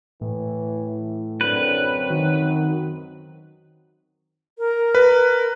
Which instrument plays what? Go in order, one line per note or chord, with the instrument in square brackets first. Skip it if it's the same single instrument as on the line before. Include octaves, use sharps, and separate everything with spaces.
[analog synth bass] A2 [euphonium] E3
[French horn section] F#2 F#3 C4 [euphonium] D3 [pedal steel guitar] B4
[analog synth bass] D#3 [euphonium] F#4
[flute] A#4
[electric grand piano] B4